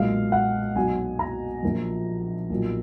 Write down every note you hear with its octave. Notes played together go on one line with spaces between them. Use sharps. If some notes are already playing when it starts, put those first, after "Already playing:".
Already playing: B1 A#2 G#3 F5
F#5
B1 B2 F#3 B3 G#5
A#5
A#1 A#2 F3
B1 A#2 F3